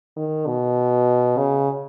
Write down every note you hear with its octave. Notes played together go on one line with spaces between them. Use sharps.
D#3
B2
C#3